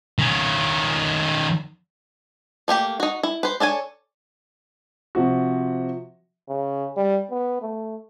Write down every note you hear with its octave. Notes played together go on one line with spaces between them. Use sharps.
D#3 C#4
A3 A#3 G4 G5
D#4 F#4
E4
B4 C5
D4 A4 C#5 G#5
C3 F3 F#4
C#3
G3
B3
A3